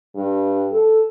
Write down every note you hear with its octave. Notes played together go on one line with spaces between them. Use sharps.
G2
A4